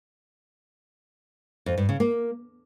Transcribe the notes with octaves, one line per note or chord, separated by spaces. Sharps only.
F2
G2
C#3
A#3